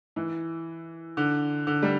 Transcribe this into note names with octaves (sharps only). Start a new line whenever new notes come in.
E3
D3
D3
G3